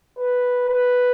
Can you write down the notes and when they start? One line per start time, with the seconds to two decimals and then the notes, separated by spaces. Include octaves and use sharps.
0.18 B4
0.69 B4